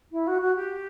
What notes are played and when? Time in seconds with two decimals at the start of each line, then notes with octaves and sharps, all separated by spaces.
0.11 E4
0.26 F#4
0.41 F#4
0.55 G4